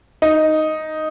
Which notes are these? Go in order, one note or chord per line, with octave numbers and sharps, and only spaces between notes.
D#4